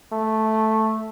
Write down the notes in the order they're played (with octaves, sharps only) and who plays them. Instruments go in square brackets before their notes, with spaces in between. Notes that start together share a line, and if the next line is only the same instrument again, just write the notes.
[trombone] A3